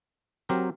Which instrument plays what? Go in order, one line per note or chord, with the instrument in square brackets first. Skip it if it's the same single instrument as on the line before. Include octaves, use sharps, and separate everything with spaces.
[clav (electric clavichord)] F#3 C4 G4 A#4